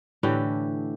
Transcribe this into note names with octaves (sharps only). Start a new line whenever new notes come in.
A2 D3 E3 G4